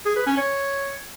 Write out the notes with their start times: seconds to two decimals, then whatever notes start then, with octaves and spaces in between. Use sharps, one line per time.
0.05 G#4
0.16 B4
0.26 C#4
0.37 C#5